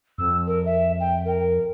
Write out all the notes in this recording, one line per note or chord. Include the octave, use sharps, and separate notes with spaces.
F2 E6
A#4
E5
G5
A#4